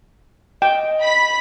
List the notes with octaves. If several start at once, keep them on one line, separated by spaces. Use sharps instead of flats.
D#5 G5
B5 B6